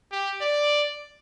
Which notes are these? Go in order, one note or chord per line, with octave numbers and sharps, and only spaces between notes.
G4
D5